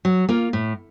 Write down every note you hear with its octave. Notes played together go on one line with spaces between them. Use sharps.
F#3
A#3 F4
A2